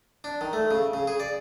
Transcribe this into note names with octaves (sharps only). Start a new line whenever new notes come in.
D4
D#3
A3
C#3
C#3
G#4
D5